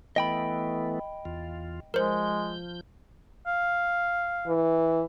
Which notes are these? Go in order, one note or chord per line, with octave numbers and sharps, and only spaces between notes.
E3 A3 B3 D#5 G5 B5
E2 F4
F3 G#3 A#4 C5 G6
F5
E3